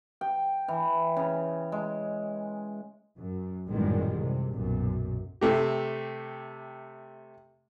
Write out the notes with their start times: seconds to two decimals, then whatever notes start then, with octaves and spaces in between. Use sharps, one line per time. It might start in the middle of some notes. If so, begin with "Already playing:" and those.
0.21 G5
0.68 E3
1.16 C#3
1.72 G#3
3.18 F#2
3.67 A1 F#2 A#2 D#3 G3 G#3
4.19 C3
4.50 B1 F#2 A#2
5.41 C3 A3 G4